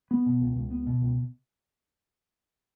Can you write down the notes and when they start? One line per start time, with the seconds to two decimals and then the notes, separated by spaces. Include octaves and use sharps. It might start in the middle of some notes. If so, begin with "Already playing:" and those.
0.11 B3
0.26 B2
0.41 C#2
0.56 C#2
0.71 B3
0.87 B2
1.02 C#2